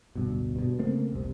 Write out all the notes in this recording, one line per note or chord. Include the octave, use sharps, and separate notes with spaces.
D1 G2 B2
G2 B2
C#3 A3 A#3 C4
F1 C2 C3